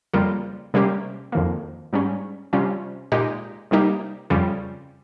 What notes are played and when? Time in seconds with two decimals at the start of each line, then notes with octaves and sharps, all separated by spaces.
0.14 F2 C#3 G3 A#3 F4
0.74 C3 G3 A#3 C#4 G4
1.32 F2 D#3 A#3
1.93 G#2 G3 C#4
2.53 C3 G3 C#4 F4
3.12 A#2 G#3 D#4 G4
3.71 C3 G3 A#3 D#4 G4
4.30 F2 C#3 G3 C#4 F4